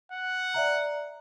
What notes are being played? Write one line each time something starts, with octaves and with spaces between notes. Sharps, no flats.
F#5
D5 E5 A#5